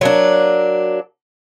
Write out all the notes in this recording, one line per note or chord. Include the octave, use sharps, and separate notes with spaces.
F#3 A#3 D4